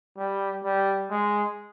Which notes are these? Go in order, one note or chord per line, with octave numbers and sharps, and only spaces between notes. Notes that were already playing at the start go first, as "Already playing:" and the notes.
G3
G3
G#3